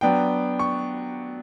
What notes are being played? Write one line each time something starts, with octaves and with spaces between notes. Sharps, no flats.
F#3 B3 D4 G5
C#6